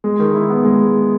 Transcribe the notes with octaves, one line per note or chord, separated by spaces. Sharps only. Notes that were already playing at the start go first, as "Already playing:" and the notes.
G#3
D#3
E4
B3
G#3